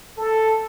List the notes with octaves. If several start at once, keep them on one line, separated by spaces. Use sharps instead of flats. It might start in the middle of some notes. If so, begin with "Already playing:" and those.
A4